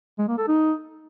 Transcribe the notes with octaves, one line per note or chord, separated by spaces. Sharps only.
G#3
A#3
A4
D#4